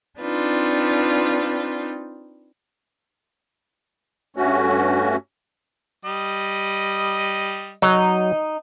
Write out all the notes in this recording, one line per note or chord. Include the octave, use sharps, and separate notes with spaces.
C4 D4 D#4 F4 B4
G2 A3 C#4 F#4
G3 D#5
F#3 D#4